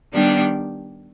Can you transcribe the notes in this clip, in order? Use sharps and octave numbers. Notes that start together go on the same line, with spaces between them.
D#3 G3 B3 D4 G4